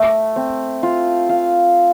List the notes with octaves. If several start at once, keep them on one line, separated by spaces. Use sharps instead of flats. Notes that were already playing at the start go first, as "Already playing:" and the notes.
Already playing: A3 E5
C4
F4
F5